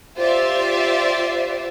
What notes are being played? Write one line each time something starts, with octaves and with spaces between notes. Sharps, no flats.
F4 G4 C5 D5 E5